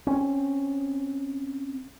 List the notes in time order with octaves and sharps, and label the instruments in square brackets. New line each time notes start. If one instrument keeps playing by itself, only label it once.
[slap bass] C4 C#4